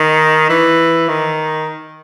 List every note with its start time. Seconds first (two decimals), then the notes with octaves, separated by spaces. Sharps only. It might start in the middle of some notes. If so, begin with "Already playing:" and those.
Already playing: D#3
0.49 E3
1.09 D#3